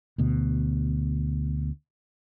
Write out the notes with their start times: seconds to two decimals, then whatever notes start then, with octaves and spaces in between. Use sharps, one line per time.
0.18 D2 B2